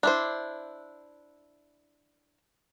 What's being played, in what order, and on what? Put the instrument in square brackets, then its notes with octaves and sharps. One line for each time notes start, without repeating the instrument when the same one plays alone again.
[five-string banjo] D4 E4 C5